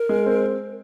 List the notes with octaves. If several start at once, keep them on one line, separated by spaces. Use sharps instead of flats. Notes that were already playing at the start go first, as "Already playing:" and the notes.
Already playing: A#4
G#3
C4